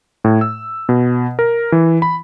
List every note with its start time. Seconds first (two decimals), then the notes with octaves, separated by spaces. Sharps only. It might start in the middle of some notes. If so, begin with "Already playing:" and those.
0.24 A2
0.41 E6
0.89 B2
1.39 A#4
1.72 E3
2.02 B5